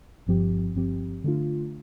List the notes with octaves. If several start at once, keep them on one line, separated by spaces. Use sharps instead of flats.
G1 G2 F3 C4 G4
G1 G2 F3 C4 G4
D3 A3 D4 F4